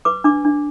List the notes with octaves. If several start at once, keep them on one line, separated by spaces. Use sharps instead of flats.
B4 D6
D4 D6
D4